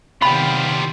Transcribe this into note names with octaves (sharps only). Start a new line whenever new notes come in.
C3 D#3 G3 B3 F4 G5 B5